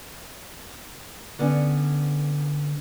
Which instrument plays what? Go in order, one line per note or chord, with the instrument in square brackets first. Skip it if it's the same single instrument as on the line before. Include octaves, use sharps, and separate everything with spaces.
[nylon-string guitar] D3 B3 C#4 D4